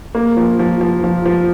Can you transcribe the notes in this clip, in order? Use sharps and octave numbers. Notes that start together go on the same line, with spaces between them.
A#3
F3
F3
F3
F3
F3